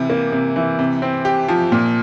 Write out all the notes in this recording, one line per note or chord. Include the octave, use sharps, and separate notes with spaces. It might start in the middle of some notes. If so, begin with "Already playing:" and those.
Already playing: C3 E3
A#3
C3
E3
C3
C4
G4
F3
A#2